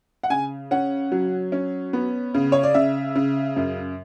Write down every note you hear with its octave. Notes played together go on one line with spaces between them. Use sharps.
F#5
C#3 G#5
C#4 F#5
F#3
C#4
B3
C#3
C#5
D5
C#3 E5
C#3
F#2